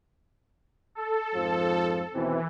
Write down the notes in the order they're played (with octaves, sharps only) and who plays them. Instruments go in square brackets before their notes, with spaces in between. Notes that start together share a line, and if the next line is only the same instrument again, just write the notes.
[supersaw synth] A4
[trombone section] F2 G#2 F3
[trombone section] D#2 B2 C4 [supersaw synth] E3